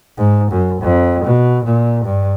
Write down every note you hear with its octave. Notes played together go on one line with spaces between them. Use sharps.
G#2
F#2
F2
B2
A#2
G2